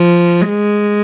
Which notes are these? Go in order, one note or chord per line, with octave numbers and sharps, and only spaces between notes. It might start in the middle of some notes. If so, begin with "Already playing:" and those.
Already playing: F3
G#3